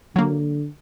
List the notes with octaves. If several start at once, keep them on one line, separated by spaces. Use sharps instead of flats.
D3 F#3 A#3